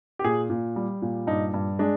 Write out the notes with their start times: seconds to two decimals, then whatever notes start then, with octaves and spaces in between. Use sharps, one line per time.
0.19 G4
0.24 A#2 G#4
0.50 A#2
0.76 G3
1.02 A#2
1.27 G2 D#4
1.54 G2
1.79 G#3 D4